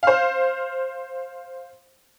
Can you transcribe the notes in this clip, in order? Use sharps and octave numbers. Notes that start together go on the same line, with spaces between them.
C5 F5